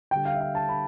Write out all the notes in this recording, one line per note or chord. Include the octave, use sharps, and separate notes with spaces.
D3 G3 G5
F5
E5
F5
A5
B5